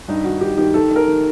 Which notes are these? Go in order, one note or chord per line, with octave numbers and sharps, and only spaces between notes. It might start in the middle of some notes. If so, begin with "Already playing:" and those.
G2 D#4
D#3 F#4
D#3 G4
D#3 G4
D#3 A4
D#3
A#4
D#3